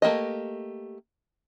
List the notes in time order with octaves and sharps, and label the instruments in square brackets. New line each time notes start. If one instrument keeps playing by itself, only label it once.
[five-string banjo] A3 A#3 G4 D#5